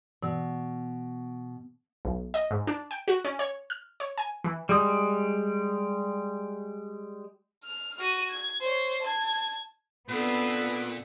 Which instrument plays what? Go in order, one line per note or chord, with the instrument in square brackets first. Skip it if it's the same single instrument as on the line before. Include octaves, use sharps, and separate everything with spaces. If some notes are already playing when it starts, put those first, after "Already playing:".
[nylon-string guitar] B2 [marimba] E3
[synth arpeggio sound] B1
D#5
G#2
D4
G5
F#4
C#4
C#5
F6
C#5
G#5
E3
[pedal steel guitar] G3 G#3 D#6
[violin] F6
F#4 D#7
G#6
C5 C#5
A5 G#6
[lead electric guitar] A#2 [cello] B3 [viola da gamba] C4 D4 A4 [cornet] B4